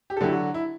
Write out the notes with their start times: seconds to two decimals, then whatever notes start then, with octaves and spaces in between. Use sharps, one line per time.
0.10 G4
0.17 A4
0.21 D3 F#3 E4 G4
0.32 F#4
0.54 E4